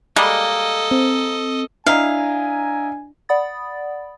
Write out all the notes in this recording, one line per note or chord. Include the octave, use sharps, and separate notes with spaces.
G3 G#3 A#3 A4 D#5
C4
D4 E4 D#5 F5 G#5 A#5
D5 F#5 B5 D#6 A6